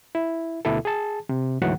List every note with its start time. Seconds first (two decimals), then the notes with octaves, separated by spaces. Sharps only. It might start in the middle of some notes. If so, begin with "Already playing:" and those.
0.15 E4
0.65 D2 B2 E4 A4
0.85 G#4 A5
1.29 C3
1.61 D2 G#2 E3 F#3 F#5